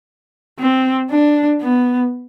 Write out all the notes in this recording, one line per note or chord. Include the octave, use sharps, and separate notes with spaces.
C4
D4
B3